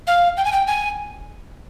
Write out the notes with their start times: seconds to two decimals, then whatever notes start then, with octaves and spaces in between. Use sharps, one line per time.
0.07 F5
0.37 G5
0.45 G#5
0.52 G5
0.67 G#5